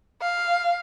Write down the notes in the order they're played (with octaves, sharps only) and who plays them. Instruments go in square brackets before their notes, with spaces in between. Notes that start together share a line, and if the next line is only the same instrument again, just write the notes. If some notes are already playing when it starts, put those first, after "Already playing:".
[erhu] F5